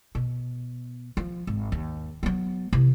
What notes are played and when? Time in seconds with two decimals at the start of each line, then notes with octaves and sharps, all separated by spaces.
0.15 B2
1.17 F3
1.47 G#1
1.72 D#2
2.23 F#3 B3
2.73 C3 E3